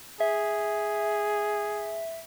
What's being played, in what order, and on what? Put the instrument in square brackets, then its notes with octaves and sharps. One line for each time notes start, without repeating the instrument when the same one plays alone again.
[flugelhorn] G#4 [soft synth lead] E5